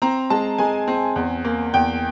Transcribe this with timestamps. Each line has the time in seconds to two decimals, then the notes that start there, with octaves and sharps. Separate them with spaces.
0.02 C4 A#5
0.30 G#3 A5
0.58 G#3 G#5
0.88 C4
1.16 E2
1.45 A#3
1.74 E2 G5